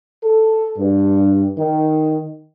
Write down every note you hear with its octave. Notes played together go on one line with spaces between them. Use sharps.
A4
G2
D#3